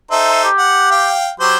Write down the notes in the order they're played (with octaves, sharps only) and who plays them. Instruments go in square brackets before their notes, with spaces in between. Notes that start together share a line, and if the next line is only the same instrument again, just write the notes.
[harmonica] D#4 A4 C5 [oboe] E5
[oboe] G4
[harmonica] F#5
F5 G5
[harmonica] F#3 C5 C6 [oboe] G4